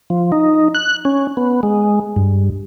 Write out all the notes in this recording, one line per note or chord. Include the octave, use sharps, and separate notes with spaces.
F3
D#4
F#6
C#4
B3
G#3
G2